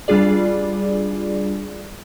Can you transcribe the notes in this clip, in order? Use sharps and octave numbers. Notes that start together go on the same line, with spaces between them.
G3 D4 F4 G#4 D5